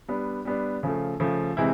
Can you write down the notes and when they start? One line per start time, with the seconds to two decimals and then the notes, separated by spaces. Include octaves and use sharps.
0.08 G3 B3 D4
0.45 G3 B3 D4
0.83 C#3 F3 A3
1.20 C#3 F3 A3
1.57 C3 E3 G#3 C4 E4